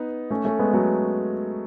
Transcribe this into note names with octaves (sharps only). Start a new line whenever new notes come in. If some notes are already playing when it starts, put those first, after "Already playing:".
Already playing: B3 D#4
A3 C#4
A3 C#4
G#3 B3
F#3 A3